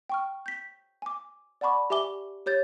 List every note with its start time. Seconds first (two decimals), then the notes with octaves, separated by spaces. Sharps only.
0.09 G5 C#6 F6
0.46 G6 B6
1.02 G#5 D6
1.61 D5 F#5 A5 B5 C#6 D6
1.90 G4 E5 G#5 D6 G7
2.46 G4 C#5 G6 A6